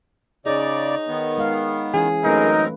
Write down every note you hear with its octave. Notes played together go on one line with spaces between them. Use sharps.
C#3 D#4 G#4 C#5 D5
D#3 B3
G#3 F5
E3 C#4 G#4
F#2 A3 C4 D#4 A#4 B4